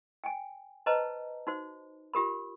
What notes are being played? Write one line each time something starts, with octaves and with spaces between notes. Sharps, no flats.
G5 G#5
B4 C5 D#5 A5 A#5
D#4 F#4 C5
F4 G4 A#4 B5